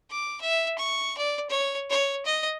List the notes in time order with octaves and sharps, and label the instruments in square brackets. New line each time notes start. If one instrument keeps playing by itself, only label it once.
[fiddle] D6
E5
C#6
D5
C#5
C#5
D#5